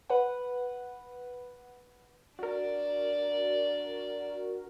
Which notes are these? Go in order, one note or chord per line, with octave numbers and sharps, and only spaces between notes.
B4 F#5
D4 F#4 A#4 D5